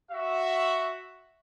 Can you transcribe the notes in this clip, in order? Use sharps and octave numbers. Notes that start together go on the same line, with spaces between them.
F#4 E5